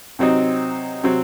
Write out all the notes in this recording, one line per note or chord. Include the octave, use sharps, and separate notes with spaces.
C3 F#3 C4 D#4
C3 F#3 C4